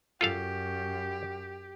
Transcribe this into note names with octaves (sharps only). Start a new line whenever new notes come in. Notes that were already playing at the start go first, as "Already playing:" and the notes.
F#2 F4 G4 A4 F5